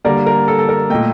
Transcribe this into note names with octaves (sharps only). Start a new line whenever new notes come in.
D3 G3 A#3 A#4 D5
A#4
A4
A4
A#4
A#2 A3 D#5 G5